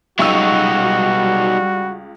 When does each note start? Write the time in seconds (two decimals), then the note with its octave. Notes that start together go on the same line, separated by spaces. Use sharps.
0.19 C#2 F#3 G3 D#4 F#4 C#6 E6